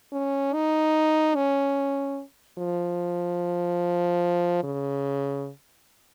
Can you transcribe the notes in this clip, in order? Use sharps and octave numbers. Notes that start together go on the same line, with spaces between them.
C#4
D#4
C#4
F3
C#3